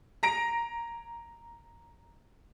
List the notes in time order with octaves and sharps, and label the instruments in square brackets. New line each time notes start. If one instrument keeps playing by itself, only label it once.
[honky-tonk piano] A#5 A#6 D7